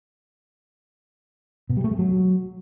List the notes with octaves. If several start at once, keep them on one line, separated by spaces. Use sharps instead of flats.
B2
G3
A3
G#3
F#3